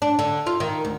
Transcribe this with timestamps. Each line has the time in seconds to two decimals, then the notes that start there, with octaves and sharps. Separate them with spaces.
0.02 D4
0.19 D3
0.47 F4
0.60 D#3
0.85 D2